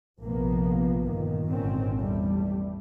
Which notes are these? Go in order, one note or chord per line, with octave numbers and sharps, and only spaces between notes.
A#1 F2 C3 F3 A#3 B3
G1 A#2 D#3
G#1 A#2 D3 D#3 C4 C#4
E2 G3 A3